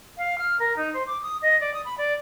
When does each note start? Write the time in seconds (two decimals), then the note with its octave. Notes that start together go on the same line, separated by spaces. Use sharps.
0.18 F5
0.39 F6
0.59 A#4
0.77 D#4
0.93 C5
1.07 D6
1.22 D#6
1.42 D#5
1.60 D5
1.74 D#6
1.85 B5
1.98 D5